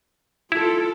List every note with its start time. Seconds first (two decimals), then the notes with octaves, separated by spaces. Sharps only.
0.52 E4 F4 A4